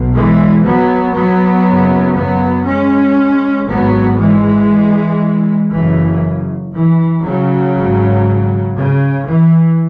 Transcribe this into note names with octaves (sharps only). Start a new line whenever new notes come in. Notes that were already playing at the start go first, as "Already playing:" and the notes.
Already playing: B1 B2
E3 G#3
F#3 B3
F#3 B3
F#1 F#2 C#3
F#3 B3
G#3 C#4
G#1 G#2 F#3 B3
E3 G#3
F#1 F#2 C#3 E3
E3
C#3 F#3
G#1 G#2
C#3
E3